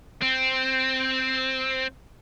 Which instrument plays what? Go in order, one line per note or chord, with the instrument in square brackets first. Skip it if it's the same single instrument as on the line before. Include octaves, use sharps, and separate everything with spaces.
[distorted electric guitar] C4